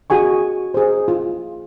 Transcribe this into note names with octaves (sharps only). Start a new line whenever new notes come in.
F#4 G#4 G#5 C#6
G#4 C5
F4